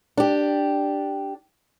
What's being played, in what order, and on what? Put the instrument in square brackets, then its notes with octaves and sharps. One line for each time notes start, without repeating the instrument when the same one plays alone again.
[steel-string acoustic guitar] D4 G4